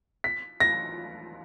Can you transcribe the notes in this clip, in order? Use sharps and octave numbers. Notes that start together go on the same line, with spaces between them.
B6
A#6